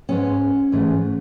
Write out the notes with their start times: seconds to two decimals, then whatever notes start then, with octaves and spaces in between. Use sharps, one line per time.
0.09 G#2 G#3 B3 C#4
0.72 G#2 E3 A3